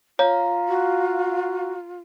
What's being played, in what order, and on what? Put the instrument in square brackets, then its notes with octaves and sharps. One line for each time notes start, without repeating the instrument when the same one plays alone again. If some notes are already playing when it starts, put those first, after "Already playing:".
[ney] F4 [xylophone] C#5 [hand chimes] F5 A#5
[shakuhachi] F#4